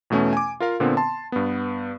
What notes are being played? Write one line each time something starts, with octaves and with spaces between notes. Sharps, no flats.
E2 B2 A3 C#4
G#5 D6
F4 A#4 F5
A#2 D3 B3 C4
A5 C6
G2 B3